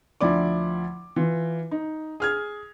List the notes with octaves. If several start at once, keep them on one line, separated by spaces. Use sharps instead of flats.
D2 F3 E4 D5 D6
E3 F4
D#4
G#4 F6 G#6